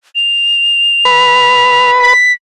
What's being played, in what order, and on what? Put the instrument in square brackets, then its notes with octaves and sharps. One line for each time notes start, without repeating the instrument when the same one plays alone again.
[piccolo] F7
[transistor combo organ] B4
[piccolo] B6